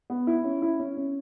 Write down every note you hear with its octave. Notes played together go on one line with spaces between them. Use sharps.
B3
E4
C#4
E4
C#4
C#4